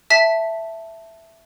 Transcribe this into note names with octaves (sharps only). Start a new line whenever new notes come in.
E5 A5 B6